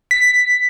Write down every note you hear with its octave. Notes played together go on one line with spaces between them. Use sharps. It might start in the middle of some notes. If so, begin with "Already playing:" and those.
B6